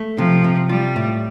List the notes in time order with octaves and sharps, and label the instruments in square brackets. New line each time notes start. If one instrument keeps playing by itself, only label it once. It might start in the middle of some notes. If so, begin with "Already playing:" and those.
Already playing: [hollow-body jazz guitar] A3
[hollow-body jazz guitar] C3 [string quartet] F3
[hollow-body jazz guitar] C3
[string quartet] G3 [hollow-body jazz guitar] F4
[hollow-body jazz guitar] A2